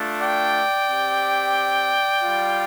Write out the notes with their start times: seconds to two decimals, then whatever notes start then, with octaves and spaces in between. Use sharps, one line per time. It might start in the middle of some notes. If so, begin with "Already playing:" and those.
Already playing: A3 D4 F4
0.21 D5 G5
0.89 C4 G4
2.24 G3 F4